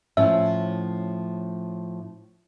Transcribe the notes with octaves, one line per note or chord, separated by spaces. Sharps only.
A2 F3 C#4 E5